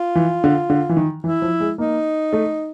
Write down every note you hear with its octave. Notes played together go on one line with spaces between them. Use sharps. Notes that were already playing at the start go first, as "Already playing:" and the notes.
Already playing: F4
E3
D3
D3
E3
D#3
E3 E4
F3
G#3
A#3 D#4
A3